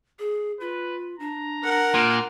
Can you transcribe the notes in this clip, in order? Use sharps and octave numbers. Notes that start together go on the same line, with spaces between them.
G#4
F4 B4
D4 A#5
A#4 F#5
A#2 F6